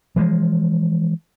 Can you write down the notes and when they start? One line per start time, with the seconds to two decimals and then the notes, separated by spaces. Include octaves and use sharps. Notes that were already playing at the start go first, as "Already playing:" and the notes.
0.16 E3 F3 G#3